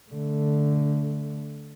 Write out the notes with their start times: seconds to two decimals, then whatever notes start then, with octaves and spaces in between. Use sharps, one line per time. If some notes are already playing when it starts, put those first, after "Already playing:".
0.11 D3 A3